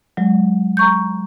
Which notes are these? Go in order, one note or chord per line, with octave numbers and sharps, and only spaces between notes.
F#3 G#3
A#5 C#6 G6